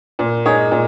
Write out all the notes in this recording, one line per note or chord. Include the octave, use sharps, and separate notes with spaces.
A#2
G#3 D#4 G#4 C#5
A#2